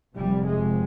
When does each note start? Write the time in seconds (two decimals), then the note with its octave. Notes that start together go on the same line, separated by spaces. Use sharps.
0.15 F1 F2 C3 G3
0.46 G#3